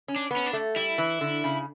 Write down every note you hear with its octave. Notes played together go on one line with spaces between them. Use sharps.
C#4
D4
B3
C#4
D4
A3
G3 E4
E3
D3
C#3